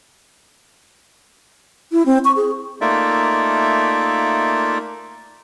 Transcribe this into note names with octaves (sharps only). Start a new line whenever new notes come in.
E4
C4
C#6
G#4
A3 A#3 D#4 F4 D5 E5